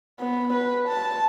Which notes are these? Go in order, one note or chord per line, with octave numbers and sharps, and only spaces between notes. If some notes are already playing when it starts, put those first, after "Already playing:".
B3
B4
A5